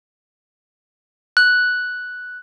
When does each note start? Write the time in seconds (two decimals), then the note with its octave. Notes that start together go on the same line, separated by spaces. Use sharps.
1.37 F#6